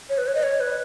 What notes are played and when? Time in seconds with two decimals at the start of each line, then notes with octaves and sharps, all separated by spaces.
0.09 C#5
0.18 B4
0.27 C#5
0.35 D#5
0.43 C#5
0.60 B4